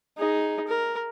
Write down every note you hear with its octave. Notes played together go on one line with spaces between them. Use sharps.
D#4 G#4
A#4